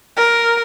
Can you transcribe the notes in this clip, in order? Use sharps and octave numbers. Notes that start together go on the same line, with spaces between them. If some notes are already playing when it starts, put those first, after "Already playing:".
A#4